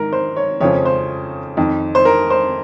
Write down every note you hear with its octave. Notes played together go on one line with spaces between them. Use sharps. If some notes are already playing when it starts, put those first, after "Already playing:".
Already playing: G#2 D#3 A#4
C5
C#5
F2 C#3 F3 C#5
C5
F2 D#3
C5
A#4
C5